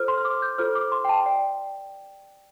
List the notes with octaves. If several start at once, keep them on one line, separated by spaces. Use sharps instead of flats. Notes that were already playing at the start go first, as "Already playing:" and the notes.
Already playing: F4 A4 C5 F6
C6
F6
D6
G6
F4 A4 C5 F6
D6
C6
G5
A5
D5 G5